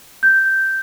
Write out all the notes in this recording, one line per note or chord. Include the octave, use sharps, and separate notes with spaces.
G6